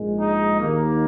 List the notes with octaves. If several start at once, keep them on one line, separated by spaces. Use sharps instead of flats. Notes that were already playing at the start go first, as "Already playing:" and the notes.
Already playing: A#1 G#2 G#3
D#4
D#2 D#3 A#3